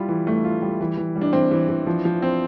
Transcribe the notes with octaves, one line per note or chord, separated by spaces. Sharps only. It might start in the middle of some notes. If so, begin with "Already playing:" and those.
Already playing: G3 E4 F4
E3
G3 A3
F4
G3
E3
E3
G3
D4
E3 C4
E3
E3
F3
F3
C4